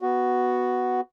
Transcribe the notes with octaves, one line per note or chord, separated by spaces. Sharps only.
B3 F#4